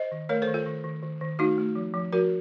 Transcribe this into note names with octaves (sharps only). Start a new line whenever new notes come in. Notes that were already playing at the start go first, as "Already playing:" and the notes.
Already playing: C5 D#5
D#3
A3 A#4 C#5
A4 C5
D#3
F4 A4
D#3
D#3
D#3
D#3
A3 D#4 F#4
A3
F3
F3
F3 F#4 A#4